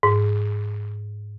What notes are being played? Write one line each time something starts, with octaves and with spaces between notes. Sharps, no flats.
G#2